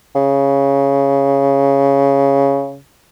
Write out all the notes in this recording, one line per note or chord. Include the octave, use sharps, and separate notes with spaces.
C#3